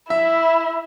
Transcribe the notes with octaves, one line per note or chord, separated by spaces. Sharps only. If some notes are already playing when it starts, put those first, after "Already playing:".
E4 E5